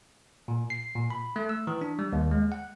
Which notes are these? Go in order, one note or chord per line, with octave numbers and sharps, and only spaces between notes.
A#2
C7
A#2
B5
A3
E6
E3
D4
G3
D#2
G#3
F#5